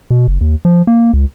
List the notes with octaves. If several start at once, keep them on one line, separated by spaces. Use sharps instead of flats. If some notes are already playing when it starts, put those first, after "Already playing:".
B2
F#1
D#2
F3
A#3
C#2